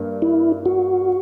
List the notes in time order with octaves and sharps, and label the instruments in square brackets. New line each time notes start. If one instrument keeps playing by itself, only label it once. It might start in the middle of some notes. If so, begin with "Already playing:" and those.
Already playing: [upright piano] G2 A#3
[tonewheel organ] E4
F#4